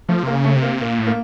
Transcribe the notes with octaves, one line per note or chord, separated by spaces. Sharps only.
F3 A3
C3 A#3
C#3
A3
C3
A#3
A#2 A#3
A2
A#3